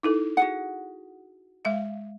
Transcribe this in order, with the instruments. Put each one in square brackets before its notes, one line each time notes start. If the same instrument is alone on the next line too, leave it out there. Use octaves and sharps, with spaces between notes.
[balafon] D#4 E4 A4
[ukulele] F#4 G#4 F#5
[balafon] G#3 E5 F5